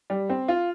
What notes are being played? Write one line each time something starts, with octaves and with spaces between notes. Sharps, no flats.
G3
C4
F4